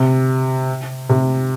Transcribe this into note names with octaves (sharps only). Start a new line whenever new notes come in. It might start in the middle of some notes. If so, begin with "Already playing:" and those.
Already playing: C3
C3